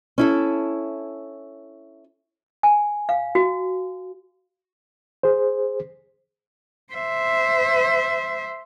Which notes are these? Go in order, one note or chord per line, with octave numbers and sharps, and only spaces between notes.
C#4 E4 A4
G#5
F5
F#4
G#4 C5
C5 E5